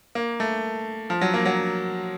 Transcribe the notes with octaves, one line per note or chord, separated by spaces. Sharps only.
A#3
A3
F3
F#3
A#3
F#3